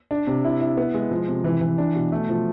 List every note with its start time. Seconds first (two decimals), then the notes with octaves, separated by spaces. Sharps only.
0.11 D4
0.27 C3
0.45 E4
0.60 E4
0.77 B3
0.94 G#3
1.11 F3
1.28 C3
1.44 E3
1.61 E3
1.78 D4
1.95 B2
2.12 A3
2.29 F3